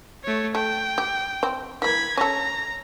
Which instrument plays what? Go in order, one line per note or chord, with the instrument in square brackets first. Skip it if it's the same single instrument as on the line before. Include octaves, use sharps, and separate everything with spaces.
[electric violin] A3 C#5
[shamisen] A3 [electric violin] G5
[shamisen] G4
C4
[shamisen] E3 A#3 [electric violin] B5 G#6
[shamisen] C#4 A4 [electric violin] A#5